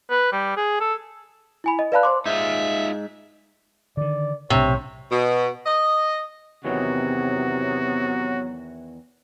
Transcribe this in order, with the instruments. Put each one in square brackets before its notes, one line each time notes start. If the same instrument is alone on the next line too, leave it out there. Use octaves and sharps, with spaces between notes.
[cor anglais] B4
G3
G#4
A4
[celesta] E4 G#5 B5
D#5
B4 D5 F5 A5 B5 F#6
C5 C6 D6
[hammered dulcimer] G#2 [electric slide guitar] D#4 F4 [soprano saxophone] E5
[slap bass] D3 D#3 [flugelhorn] D5
[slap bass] B1 A2 [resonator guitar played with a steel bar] C3 [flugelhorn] C#5
[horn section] B2
D#5
[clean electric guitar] E2 D#3 E3 [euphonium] C3 [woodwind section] F#3 B3 [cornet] F#4